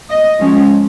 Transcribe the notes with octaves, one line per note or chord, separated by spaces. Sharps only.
D#5
F3 G#3 C#4